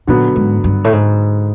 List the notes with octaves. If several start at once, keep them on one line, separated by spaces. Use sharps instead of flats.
A#2 D3 F#3 B3
G#2
G2
A2
G#2